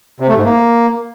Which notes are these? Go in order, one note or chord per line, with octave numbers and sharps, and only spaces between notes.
C3
A3
G#2
A#3